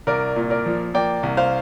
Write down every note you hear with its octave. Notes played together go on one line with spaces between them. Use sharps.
C2 A#4 D5
A#2
A#4 D5
F3
A#3 D5 G5
C2
C5 F5